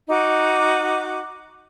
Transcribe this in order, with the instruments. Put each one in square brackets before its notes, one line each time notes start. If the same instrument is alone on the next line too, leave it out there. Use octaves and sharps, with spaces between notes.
[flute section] D#4 F#4 D6